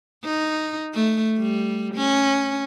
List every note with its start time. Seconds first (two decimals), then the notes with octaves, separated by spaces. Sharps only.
0.24 D#4
0.94 A3
1.38 G3
1.95 C#4